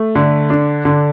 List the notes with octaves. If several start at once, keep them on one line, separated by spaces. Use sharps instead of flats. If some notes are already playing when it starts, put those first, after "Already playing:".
Already playing: A3
D3
D4
D3